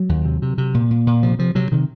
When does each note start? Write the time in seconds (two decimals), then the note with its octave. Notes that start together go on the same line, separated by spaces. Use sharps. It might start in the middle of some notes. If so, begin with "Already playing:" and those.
Already playing: F#3
0.09 D#2
0.25 C3
0.42 C3
0.58 C3
0.74 A#2
0.91 A#2
1.07 A#2
1.23 C3 F3
1.39 C3 F3
1.55 C3 F#3
1.72 C3 D#3